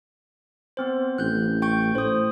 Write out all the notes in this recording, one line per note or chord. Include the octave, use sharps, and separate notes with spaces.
B3 C4 C5
A1 F#6 G6
G5 C#6 G6
A2 C5 D#6